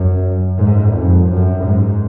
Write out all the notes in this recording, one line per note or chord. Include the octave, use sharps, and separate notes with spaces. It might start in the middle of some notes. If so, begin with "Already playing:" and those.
Already playing: F#2
G#2
F2
F#2
G#2